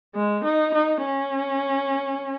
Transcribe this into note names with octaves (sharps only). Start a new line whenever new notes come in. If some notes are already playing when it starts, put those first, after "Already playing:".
G#3
D#4
D#4
C#4